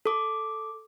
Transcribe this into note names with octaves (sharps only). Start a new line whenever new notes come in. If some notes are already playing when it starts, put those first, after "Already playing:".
A4 D6